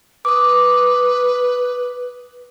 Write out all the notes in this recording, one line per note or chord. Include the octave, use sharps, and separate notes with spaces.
B4 D6 D#6